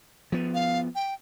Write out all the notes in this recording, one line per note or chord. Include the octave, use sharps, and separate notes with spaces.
F3 B3
F5
G5